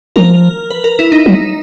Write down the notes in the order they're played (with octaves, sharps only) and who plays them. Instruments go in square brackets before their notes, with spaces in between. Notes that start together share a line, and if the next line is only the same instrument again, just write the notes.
[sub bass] F3 [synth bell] A#4
[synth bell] B4
A#4
E4
D#4
[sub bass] F#3